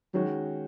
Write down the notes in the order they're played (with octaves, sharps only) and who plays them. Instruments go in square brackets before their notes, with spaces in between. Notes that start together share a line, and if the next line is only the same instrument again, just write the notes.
[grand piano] D#3 G#3 C#4 F#4 [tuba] F#3